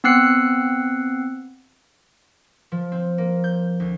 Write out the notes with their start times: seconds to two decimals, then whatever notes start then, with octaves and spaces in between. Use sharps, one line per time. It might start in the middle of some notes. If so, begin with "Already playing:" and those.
0.04 B3 C4 E6 F#6 C7 C#7
2.72 F3
2.92 C4
3.18 A#3
3.44 G6
3.80 D2